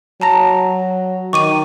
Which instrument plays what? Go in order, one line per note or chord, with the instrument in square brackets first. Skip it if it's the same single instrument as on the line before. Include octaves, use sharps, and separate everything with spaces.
[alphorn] F#3 [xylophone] A5 A#5 A#6
[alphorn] D#3 [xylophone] C#6 D6 D#7